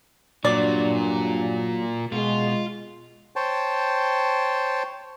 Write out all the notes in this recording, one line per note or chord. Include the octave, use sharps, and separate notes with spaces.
G2 A#2 F#3 D4 D5
B2 G#3 F4
C5 C#5 G5 A5